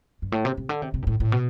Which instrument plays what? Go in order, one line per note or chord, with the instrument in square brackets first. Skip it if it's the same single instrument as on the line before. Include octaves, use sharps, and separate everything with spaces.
[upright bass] G2
A2
C3
C3
D3
C3
C3
G2
A2
A2
B2